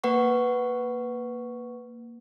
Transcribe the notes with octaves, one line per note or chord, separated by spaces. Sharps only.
A#3 B4 F#5 C#6